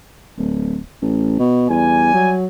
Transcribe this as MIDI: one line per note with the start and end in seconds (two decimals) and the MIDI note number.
0.38 0.79 26
1.02 1.34 33
1.39 1.67 47
1.70 2.14 40
1.70 2.34 55
1.70 2.34 80
2.15 2.47 54